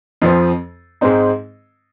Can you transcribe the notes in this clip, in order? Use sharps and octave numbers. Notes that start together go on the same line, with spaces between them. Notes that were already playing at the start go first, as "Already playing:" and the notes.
F2 F3 C4
G#2 G#3 C4 D#4